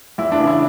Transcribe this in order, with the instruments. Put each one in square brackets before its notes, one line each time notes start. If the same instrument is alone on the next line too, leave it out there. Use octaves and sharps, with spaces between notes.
[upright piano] E2 E4
D4
C#3 E3
E4